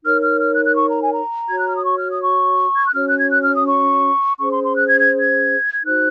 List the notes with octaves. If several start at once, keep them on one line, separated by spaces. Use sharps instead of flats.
D#4 A#4 C#5 F6
F6
F6
F#6
F#6
C#6
A#5
G#5
A#5
F#4 C#5 G#6
F#6
F6
D#6
C#6
F6
D#6
C#6
G#6
F#6
C#4 F#4 C#5 F6
F#6
G#6
F#6
F6
D#6
C#6
C#4 G#4 C5 C#6
C6
C6
F#6
G#6
G#6
G#6
G#6
D#4 F#4 C5 F#6